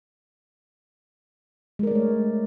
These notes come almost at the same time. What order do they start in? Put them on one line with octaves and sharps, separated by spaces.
G#3 A#4 D5 A3 C#5